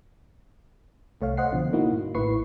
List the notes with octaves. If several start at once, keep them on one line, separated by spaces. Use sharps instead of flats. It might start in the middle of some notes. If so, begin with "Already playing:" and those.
C2 A3 C#5 F5
C5 D#5 F#5 C7
B2 D3 F3
A#3 D#4 E4 F#4
G#2
A1 A2 E4 B4 C#6 C7